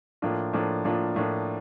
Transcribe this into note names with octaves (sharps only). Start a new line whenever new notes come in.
A2 F3 A#3 D4 F4
A2 F3 A#3 D4 F4
A2 F3 A#3 D4 F4
A2 F3 A#3 D4 F4